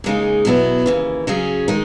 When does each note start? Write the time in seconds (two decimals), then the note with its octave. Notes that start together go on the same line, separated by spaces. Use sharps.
0.04 D#2 C#3 G#3 D#4 G#4
0.45 E2 B2 F#3 B3 E4
0.86 D#2 C#3 E3
1.27 C#3 F#3 C#4 G#4
1.68 D#3 G#3